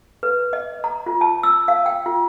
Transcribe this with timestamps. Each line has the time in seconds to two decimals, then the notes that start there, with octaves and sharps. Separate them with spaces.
0.23 B4
0.53 D#5
0.84 A#5
1.06 F4
1.21 A5
1.43 E6
1.68 F5
1.86 G5
2.06 F4